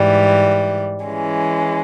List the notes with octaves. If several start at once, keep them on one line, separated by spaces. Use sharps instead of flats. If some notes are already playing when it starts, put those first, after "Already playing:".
Already playing: G#2 E3 G3
E3 G#3 C#4